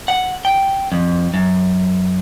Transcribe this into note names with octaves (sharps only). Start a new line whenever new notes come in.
F#5
G5
F2
F#2